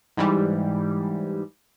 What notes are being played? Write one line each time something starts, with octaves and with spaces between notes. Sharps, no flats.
G#2 E3 G3